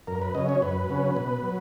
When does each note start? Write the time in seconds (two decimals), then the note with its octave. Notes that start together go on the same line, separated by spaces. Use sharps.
0.07 F#2 A#4
0.22 B4
0.35 C#3 F#3 C#4 D#5
0.49 C#5
0.62 F#2 B4
0.89 C#3 F#3 C#4
1.16 B2
1.43 F#3